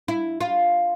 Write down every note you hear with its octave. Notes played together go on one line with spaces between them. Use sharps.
E4
F4